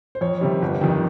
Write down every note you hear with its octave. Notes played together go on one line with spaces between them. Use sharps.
C5
F2 C#5
C3 D#3 G3
G1
F2 C3 D#3